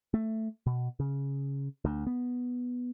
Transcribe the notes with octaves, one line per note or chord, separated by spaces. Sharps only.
A3
B2
C#3
D2
B3